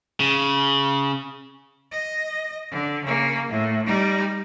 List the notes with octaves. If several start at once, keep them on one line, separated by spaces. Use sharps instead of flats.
C#3
D#5
D3
C#3 A#3
A2
G3 D#4